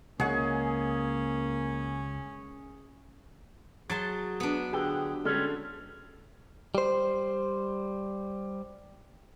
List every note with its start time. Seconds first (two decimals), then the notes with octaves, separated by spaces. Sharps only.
0.20 C#2 A#3 C#4 G#4 F#5
3.90 F#3 G#4 A5 C6 A6
4.40 B3 D4
4.73 D3 G4 G#4 B4 G5
5.25 D3 G3 G#3 C#4 A4
6.75 G3 C5